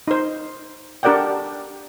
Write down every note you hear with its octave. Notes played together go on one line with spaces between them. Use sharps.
D#4 C5
D4 G4 A#4 D5 F#5 G5